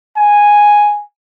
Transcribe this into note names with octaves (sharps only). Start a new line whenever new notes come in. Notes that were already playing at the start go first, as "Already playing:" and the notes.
G#5